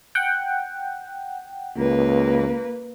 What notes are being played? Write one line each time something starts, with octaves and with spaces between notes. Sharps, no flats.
F#5 G5
C#2 A#3 B4